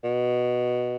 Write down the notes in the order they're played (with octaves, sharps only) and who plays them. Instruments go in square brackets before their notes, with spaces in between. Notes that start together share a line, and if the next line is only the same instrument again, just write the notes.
[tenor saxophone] B2